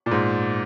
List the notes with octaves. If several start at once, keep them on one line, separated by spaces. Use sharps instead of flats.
A#2
G#2